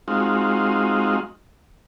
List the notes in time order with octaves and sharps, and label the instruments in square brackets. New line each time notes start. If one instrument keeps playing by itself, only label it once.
[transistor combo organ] G#3 C4 D#4 F4 F#4